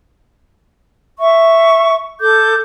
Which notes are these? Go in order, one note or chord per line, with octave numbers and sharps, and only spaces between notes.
E5 C#6
A4 D6 G6